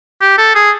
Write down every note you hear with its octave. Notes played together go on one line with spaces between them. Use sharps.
G4
A4
G#4